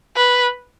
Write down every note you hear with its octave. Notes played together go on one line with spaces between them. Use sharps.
B4